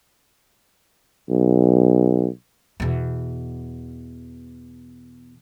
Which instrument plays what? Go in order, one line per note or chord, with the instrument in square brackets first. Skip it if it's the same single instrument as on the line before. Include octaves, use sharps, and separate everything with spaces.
[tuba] B1
[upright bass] E2 B2